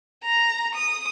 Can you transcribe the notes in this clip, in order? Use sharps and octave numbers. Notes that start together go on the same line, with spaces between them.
A#5
D#6